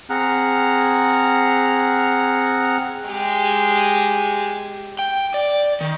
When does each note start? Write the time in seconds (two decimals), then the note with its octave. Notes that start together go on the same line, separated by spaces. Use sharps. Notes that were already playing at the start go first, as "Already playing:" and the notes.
0.10 C4 G#4 F#5 A#5 F6 F#6
3.08 G#3 G4
4.99 G5
5.34 D5
5.81 D#3